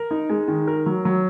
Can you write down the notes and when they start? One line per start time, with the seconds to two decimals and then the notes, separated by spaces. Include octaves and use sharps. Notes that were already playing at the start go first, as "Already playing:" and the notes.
Already playing: A#4
0.11 D#4
0.30 G#3
0.48 D#3
0.67 A#4
0.86 F#3
1.05 F#3